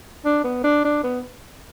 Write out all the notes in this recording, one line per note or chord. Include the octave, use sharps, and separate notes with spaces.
D4
B3
D4
D4
B3